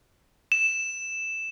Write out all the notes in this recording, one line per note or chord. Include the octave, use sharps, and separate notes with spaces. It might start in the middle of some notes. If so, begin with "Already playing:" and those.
E7